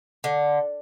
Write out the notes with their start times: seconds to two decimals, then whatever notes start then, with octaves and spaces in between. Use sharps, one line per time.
0.24 D3